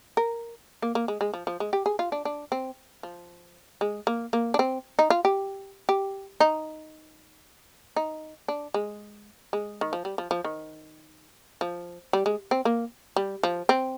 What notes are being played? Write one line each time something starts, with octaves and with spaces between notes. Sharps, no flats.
A#4
A#3
A#3
G#3
G#3
F3
F3
G#3
G4
G#4
F4
D4
D4
C4
F3
G#3
A#3
A#3
D4
C4
D#4
F4
G4
G4
D#4
D#4
D4
G#3
G#3
D#3
F3
G3
F3
F3
D#3
F3
G3
G#3
C4
A#3
G3
F3
C4